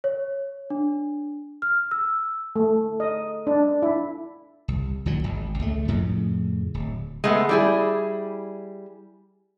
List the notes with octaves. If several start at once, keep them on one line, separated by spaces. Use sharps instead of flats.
C#5
D4
F6
E6
A3
D#5
D4
E4
C2
D2 A#2 F#3
G#1
C#2 A3
F2 A2 C#3
D1
G#3 A3 B3
G3 E4 G#4